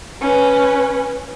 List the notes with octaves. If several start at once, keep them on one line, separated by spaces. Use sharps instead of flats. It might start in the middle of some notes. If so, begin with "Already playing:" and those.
C#4 B4